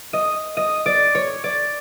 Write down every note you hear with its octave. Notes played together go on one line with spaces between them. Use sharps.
D#5
D#5
D5
C#5
D5